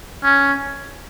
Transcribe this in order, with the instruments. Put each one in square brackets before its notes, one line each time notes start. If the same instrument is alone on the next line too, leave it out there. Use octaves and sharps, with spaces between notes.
[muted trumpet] C#4